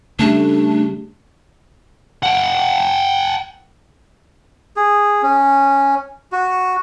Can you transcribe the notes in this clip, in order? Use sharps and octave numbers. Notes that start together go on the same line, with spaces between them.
C#3 G3 A3 D4
F#5 G5
G#4
C#4
F#4